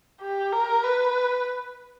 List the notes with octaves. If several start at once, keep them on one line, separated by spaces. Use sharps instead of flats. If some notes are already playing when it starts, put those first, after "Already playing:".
G4
A#4
B4